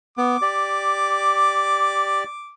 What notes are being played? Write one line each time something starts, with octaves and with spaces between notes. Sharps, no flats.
B3 D6
G4 D5